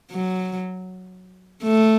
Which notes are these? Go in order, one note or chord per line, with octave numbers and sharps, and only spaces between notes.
F#3
A3